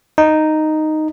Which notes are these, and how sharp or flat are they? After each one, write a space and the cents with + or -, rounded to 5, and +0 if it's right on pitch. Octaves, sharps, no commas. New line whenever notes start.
D#4 -5